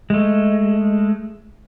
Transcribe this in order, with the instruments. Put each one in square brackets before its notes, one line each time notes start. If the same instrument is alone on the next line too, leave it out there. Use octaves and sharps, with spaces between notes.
[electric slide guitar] G#3 A3